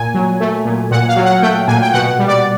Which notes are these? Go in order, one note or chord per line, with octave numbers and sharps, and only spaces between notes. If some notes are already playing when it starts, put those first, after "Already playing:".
Already playing: A#2 G#5
F#3
A3
A#2
A#2 F#5
F5
F#3
F#5
A3 G5
A#2 G#5
G5
B2 F#5
G3
D5